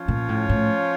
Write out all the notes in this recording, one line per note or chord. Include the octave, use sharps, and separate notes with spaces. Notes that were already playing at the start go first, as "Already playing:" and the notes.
Already playing: F3 C#4 F4 C#5
A#2
A2
A2